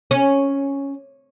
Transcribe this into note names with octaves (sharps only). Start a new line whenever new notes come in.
C#4